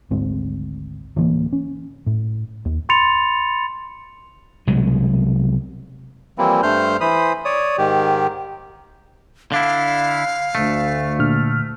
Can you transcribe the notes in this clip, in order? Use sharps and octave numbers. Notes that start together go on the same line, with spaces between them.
G#1 D2 G#2 C4
D1 E3 A#3
C#4
A2
D#2
B5 C6 A6 C#7 F7
C2 B2 F#3 G#3
E3 F3 G3 A#3 C4 E4
G2 A3 C5 F6 G6
E3 C5 B5 D#6
C#5 D5 D#6
G#2 D#3 G4
D3 D4 E4 F5
D2 A3
A#2 D3 F6